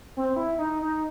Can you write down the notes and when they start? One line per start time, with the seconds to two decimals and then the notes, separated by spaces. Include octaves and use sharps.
0.17 C4
0.36 E4
0.58 D#4
0.82 D#4